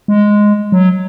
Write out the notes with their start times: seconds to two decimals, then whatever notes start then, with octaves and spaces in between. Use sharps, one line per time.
0.08 G#3
0.72 F#3